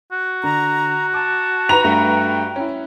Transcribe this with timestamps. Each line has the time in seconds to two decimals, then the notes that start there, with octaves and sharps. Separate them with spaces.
0.12 F#4
0.43 D3 A#5
1.14 A5 D6
1.69 B4 A#5 F7
1.84 G2 A3 G5
2.56 C#4 E4